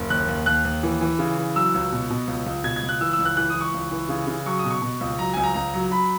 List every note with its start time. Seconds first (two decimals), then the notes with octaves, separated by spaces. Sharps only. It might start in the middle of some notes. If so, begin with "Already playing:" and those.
Already playing: F#1
0.10 D#2 F#6
0.28 D#2
0.46 D#2 F#6
0.65 D#2
0.83 E3
1.01 E3
1.19 C#3
1.38 E3
1.56 F#3 E6
1.74 C#2
1.92 B2
2.10 B2
2.27 C#2
2.46 C#2
2.64 B2 G#6
2.76 G#6
2.83 C#2
2.89 F#6
3.01 E3 E6
3.13 E6
3.19 C#2
3.25 F#6
3.37 E3 F#6
3.50 E3 D#6
3.61 C#6
3.74 C#2
3.91 E3
4.09 C#3
4.27 C#3
4.46 F#3 C#6
4.59 D#6
4.64 B2
4.70 C#6
4.82 B2
5.01 C#2
5.18 F#3 A#5
5.33 C#2 G#5
5.43 A#5
5.54 C#2 A#5
5.74 F#3
5.91 F#3 B5